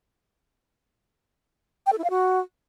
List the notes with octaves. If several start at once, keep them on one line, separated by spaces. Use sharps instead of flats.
G5
A4
E4
F5
F#4